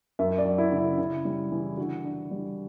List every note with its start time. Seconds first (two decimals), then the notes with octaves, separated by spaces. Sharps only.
0.19 F#2 E5
0.38 D5
0.45 F#3
0.58 E4
0.72 C#3
0.78 E4
0.98 C#3 E4
1.25 G3
1.52 E3
1.77 D3 F#4
2.04 D4
2.31 G3